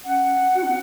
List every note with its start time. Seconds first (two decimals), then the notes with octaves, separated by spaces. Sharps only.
0.05 C#4 F#5
0.55 F#4
0.63 C#4
0.67 C4